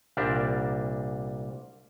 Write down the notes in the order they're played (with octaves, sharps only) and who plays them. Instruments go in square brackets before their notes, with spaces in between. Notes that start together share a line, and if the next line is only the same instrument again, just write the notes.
[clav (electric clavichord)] C2 A#2 G3 D4 A#4 E5